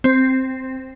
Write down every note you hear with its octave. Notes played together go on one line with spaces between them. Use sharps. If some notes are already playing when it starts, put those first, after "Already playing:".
C4